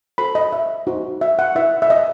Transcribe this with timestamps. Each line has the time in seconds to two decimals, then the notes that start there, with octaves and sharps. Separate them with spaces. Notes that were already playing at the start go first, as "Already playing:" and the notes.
0.18 F#4 A4 C5 B5
0.35 D#5
0.53 E5
0.87 D#4 F#4 C5
1.21 E5
1.39 F#5
1.55 E4 B4 E5
1.82 E5
1.90 D#5